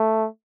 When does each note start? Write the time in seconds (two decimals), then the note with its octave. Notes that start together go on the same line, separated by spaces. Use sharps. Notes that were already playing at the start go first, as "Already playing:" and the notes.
Already playing: A3